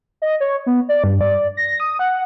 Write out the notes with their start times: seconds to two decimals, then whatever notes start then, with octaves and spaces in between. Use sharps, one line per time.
0.22 D#5
0.40 C#5
0.66 B3
0.89 D5
1.04 G2
1.21 D5
1.57 A#6
1.80 D#6
1.99 F#5